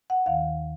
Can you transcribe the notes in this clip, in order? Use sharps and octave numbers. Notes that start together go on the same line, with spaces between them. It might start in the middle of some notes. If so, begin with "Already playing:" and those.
F#5
D#2 D#3 F5